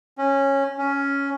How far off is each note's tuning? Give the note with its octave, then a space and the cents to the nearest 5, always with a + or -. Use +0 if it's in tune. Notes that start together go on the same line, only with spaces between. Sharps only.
C#4 -15
C#4 +5